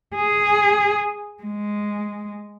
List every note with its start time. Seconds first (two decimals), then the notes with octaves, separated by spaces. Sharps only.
0.15 G#4
1.43 G#3